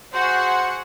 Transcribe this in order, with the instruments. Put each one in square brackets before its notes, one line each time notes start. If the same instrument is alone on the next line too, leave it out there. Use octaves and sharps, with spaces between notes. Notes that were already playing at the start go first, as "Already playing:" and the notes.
[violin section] F#4 G#4 F#5 [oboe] C5